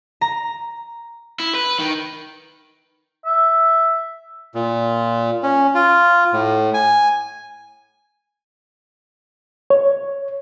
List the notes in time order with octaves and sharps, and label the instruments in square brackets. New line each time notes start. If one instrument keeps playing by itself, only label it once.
[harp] A#5
[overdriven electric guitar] E4
B4
D#3
[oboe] E5
[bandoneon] A#2
C#4
F4
A2
G#5
[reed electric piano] C#5